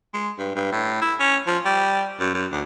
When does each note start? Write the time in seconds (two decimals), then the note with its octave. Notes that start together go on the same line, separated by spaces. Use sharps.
0.14 G#3
0.38 G2
0.55 G2
0.72 A2
1.02 E4
1.20 C#4
1.47 F3
1.65 G3
2.20 F#2
2.34 F#2
2.52 D2